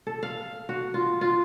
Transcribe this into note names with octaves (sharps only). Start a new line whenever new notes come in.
A4
F5
F#4
F4
F4